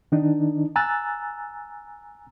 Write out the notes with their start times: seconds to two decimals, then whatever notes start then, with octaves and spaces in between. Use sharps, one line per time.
0.12 D#3 D4 D#4
0.76 G#5 A#5 E6 F#6 A6